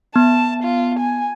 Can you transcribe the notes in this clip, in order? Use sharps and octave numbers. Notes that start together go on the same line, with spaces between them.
B3 A5
F4
G#5